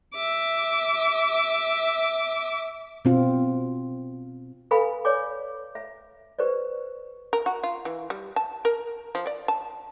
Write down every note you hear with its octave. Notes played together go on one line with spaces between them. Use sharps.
E5 D6
B2 C4 F4
A4 B4 F5 F#5 G#5 B5
C#5 D5 G#5 D6
E5
G4 B4 C5 D5
A#4
F#4
F4
E3
G3
A5
A#4
F3
D5
A5